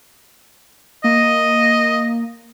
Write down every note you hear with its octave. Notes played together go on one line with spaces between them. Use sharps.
A#3 D#5